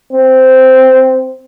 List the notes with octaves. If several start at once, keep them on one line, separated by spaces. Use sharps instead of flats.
C4